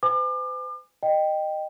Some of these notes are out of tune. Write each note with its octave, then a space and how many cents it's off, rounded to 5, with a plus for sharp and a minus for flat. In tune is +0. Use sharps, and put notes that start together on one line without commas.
C5 -45 G#5 -10 D6 +35
D#5 -15 G5 +0